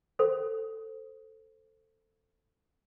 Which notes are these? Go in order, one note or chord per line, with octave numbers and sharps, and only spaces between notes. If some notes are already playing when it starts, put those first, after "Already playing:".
A4 C5